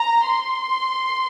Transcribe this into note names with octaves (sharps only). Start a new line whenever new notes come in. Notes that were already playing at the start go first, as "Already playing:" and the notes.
Already playing: A#5
C6